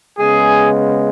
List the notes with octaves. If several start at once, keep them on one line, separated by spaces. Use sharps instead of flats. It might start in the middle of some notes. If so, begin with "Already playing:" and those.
C#3 G#3 B3 G#4